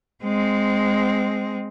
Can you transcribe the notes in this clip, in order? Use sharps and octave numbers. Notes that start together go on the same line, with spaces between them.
G#3 C4